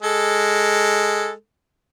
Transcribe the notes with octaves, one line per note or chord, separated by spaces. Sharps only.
G#3 A4